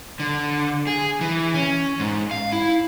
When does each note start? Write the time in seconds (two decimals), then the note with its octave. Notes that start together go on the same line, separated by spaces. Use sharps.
0.20 D3
0.87 G#4
1.21 E3
1.54 C#4
2.00 G#2
2.31 F5
2.53 E4